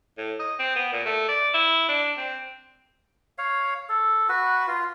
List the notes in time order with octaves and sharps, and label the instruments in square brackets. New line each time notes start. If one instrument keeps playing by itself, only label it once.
[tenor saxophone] A2
D#5
C4
B3
A#2
A3
D5
E4
D4
C4
[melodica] C#5 F5
A4
F#4 B4
F4